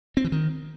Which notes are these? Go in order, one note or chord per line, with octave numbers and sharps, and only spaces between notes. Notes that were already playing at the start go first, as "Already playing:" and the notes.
C4
E3
D#3